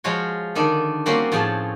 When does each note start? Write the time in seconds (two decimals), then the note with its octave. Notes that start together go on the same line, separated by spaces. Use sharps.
0.04 F3 G#3 F4 F#4 C#5
0.55 D3 D#3 D4
1.06 G3 A#3 C4 C#4 F#4 G4
1.32 A2 F3 G#4 G5 A5